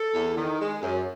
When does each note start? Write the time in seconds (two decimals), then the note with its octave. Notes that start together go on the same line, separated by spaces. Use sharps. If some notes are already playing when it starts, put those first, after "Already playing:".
Already playing: A4
0.14 E2
0.36 D#3
0.59 G#3
0.82 F#2